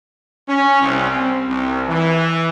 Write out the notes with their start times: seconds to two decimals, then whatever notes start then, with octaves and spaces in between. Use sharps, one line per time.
0.48 C#4
0.81 C2
1.11 C4
1.49 C2
1.88 E3